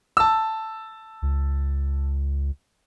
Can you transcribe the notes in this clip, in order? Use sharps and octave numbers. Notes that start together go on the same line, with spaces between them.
A5 E6
C#2